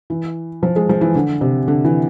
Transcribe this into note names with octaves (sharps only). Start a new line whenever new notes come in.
E3
F3
G#3
F3
E3
D3
C3
D3
E3